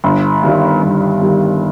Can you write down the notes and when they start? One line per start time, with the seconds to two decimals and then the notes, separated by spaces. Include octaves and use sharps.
0.04 G1
0.43 G2 D#3 G3
0.83 G1
1.22 G2 D#3 G3